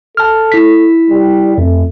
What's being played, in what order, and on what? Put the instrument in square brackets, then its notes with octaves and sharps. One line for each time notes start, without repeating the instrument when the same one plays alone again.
[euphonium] A4 [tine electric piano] A5 F6
[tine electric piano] E4 B6
[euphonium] G3
[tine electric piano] F2 [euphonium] A3